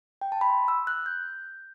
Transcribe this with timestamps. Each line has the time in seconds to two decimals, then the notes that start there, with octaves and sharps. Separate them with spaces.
0.22 G5
0.32 A5
0.41 B5
0.50 C6
0.68 E6
0.87 F#6
1.06 G6